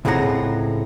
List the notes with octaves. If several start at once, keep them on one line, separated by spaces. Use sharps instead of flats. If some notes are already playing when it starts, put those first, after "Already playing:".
C#2 A2 C4 G#4 F#5 A#5